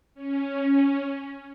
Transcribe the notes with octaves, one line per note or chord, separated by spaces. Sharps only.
C#4